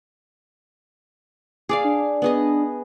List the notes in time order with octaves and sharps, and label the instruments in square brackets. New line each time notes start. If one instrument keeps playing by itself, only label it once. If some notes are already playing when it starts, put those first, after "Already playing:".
[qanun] G#4 D5 F5 [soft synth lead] D6
[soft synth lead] D4
[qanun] B3 G#4 D#5